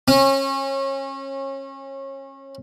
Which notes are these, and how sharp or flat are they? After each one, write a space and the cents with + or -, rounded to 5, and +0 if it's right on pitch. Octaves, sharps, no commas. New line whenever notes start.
C#4 -30